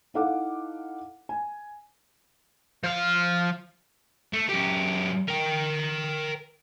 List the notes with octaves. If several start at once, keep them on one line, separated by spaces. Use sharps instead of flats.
D#4 E4 A4 F5 F#5 D6
G#5
F3 F5
A3
F#2 G4
A#4 G5